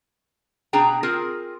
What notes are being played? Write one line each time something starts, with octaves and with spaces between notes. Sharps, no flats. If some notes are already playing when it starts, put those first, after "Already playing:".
B2 D4 G#4 G5 A#5
C4 F4 G#4 A#4